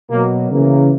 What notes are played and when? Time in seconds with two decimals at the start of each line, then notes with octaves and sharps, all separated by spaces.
0.10 B2 F#3 A#3
0.51 C#3 E3 A#3